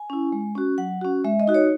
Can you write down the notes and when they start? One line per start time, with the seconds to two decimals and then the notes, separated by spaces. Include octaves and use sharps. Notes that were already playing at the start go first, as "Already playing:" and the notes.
Already playing: G#5
0.10 C#4 E4
0.32 G#3
0.55 C#4 F#4
0.78 F#3 F#5
1.01 C#4 F#4
1.25 G#3 E5
1.40 D#5
1.48 D#4 F#4
1.54 C#5